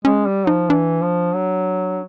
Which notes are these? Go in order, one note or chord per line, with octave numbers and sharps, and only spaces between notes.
G#3 C#4
G3
F3 D#4
E3 D4
F3
F#3